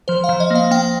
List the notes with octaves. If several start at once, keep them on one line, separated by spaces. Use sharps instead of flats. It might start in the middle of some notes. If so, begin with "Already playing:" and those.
F3 C5
F5
F3
D#5
A#3 F5
A#3 G5